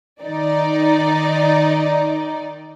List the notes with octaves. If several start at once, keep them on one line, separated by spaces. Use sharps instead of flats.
D#3 D#4 D5